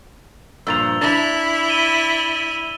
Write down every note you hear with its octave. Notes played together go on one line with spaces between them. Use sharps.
G2 A#2 F3 E6 A6 F7
D4 E4 A6
D#7 E7 G7